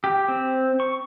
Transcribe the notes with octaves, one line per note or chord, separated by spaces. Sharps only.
G4
C4
C#6